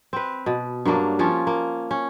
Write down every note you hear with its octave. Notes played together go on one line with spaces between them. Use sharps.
C4 B4
B2
G2 F#3 A#3 D4
F3 C#4 F4
A#3
C#4